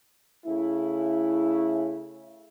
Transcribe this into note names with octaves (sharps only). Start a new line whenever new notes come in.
C#3 A3 E4